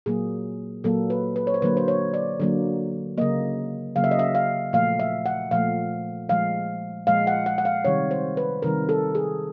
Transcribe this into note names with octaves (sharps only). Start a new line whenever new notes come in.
A#2 F#3 A#3 G#4
A#2 F#3 A#3 A4
B4
B4
C#5
C5
D3 F#3 A#3 B4
C5
C#5
D5
D3 F#3 A#3
C#3 F#3 A#3 D#5
C#3 F#3 A#3 F5
E5
D#5
E5
F5
A#2 F3 A3 F5
E5
F#5
A#2 F3 A3 F5
A#2 F3 G#3 F5
A#2 F3 G#3 F5
F#5
F#5
F#5
F5
C3 D#3 G3 C#5
C5
B4
C3 D#3 G3 A#4
A4
G#4